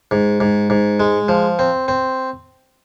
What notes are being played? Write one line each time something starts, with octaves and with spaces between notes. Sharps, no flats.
G#2
G#2
G#2
G#3
F3
C4
C4